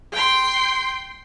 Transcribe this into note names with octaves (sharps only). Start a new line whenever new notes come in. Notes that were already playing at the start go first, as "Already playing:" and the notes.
G5 C6